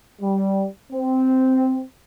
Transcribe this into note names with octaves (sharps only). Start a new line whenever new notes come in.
G3
C4